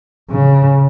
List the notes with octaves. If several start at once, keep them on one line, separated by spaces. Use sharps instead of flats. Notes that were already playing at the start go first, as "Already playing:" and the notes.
C#3